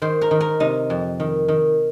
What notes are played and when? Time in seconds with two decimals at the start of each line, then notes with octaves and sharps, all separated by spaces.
0.02 D#3 C5
0.21 A#4
0.31 D#3
0.40 A#4
0.60 C3 D#4
0.90 F2
1.20 D#3
1.48 D#3